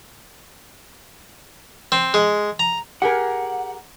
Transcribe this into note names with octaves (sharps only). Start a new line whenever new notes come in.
C4
G#3
A#5
G4 G#4 A#4 F#5